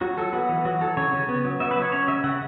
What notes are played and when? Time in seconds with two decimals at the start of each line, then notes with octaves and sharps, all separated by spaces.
0.01 F#3 F#4
0.17 F#3 A4
0.33 B3 F#4
0.49 E3
0.65 F#3 F#4
0.81 F#3 A4
0.97 C#3 C#5
1.13 C#3
1.29 B3
1.44 F#3
1.60 B3 E5
1.71 B4
1.76 F#3
1.82 C#5
1.92 C#4 C#5
2.08 C#3 E5
2.24 C#3 F#5